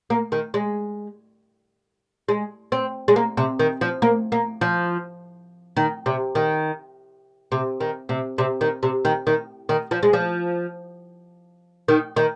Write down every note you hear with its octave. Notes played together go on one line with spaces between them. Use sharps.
A#3
D#3
G#3
G#3
C4
G#3
A#3
C3
D#3
F3
A#3
A#3
F3
D#3
C3
D#3
C3
D#3
C3
C3
D#3
C3
D#3
D#3
D#3
F3
G#3
F3
D#3
D#3